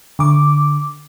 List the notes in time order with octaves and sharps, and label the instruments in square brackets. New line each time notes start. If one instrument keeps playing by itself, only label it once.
[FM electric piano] D3 D6